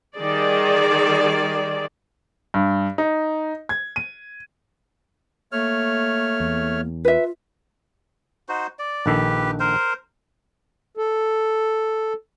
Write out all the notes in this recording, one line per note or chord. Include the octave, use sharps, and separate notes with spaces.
D#3 G3 G#4 D5
G2
D#4
G#6
D#7
A3 A#3 C#5 F6
E2
F4 B4 E5
D#4 F#4 C5
D5
A#1 D#3 G4 A4 B4
A#4 C5
A4